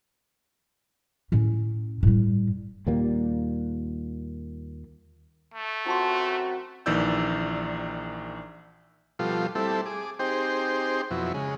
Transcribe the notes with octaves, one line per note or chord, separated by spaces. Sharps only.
A2 C#4
A2 G3
D#2 A#2 G3 A#3
A3
F#2 C4 F4 F#4 A5 C6
A#1 D#3 E3 D5 E6 G6
B2 F3 G3 F4 A4
G3 A3 C4 E4 A4
G#4 D6
C4 D#4 G4 G#4 C5 G5
F2 B2 F#3 E4
C#3 G#3